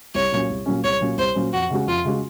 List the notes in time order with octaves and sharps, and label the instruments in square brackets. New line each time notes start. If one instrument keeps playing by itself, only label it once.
[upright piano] C2 [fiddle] C#5
[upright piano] A#2 F#3 C#4
C2
A#2 F#3 C#4
[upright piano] C2 [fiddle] C#5
[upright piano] A#2 F#3 C#4
[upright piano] C2 [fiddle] C5
[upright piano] A#2 F#3 C#4
[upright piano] F2 [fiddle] F#4
[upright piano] C#3 G#3 C#4 F#4
[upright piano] F2 [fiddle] F4
[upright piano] C#3 G#3 C#4 F#4